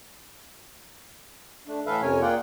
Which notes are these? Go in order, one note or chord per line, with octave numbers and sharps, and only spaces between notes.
A3 D4
A2 E3 A4 B4 E5 F5
F2 C3 C#4 A#4 C#5 G#5
A#3 F4 G#4 D5 F#5 G5